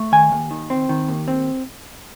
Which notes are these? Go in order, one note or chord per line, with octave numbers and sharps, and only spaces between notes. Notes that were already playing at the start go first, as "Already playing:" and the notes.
Already playing: A3
D#3 G#5
D#2
D#3
C4
D#3
D#2
C4